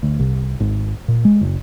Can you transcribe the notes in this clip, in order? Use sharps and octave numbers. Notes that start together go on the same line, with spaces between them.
D2
C2
G#1
A#2
G#3
F#1